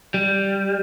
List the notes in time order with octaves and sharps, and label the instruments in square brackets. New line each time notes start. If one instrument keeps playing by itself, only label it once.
[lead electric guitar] G3